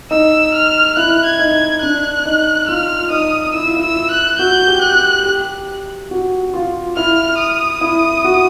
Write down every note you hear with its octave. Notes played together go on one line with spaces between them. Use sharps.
D#4 E6
F6
E4 F#6
G#6
D#4
G#6
D4 F#6
D#4
F4 F6
D#4 D#6
E4 E6
F4
E4
E6
F#6
F#4 G6
G4
F#6
G4
G4
F#4
F4
E4 F6
D#6
E4
F#4